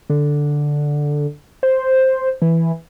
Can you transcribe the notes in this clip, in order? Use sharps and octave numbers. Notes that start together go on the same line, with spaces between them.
D3
C5
E3